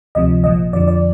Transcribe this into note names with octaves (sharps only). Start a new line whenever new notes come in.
D2 C3 F3 D#5
A#1 A#2 F3 D#5
F2 D3 F3 D5
D5